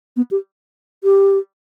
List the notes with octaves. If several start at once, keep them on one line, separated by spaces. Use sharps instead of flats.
B3
G4
G4